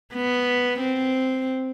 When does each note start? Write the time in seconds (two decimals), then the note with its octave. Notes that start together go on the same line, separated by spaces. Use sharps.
0.14 B3
0.79 C4